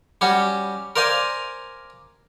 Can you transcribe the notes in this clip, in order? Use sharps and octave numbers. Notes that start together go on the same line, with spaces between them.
G3 C#4 F#4
A#4 C5 D5 F5 G#5